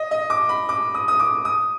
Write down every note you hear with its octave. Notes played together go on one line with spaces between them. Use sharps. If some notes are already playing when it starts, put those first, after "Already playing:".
Already playing: D#5
D#5
D6
B5
D6
D#6
D#6
D6
D#6